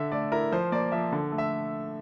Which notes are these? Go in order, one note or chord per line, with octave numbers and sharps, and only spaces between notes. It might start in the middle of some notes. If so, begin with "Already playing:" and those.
Already playing: D3 E5
A3 D5
E4 A#4
F3 C5
A#3 D5
F3 E5
D3
A3
E5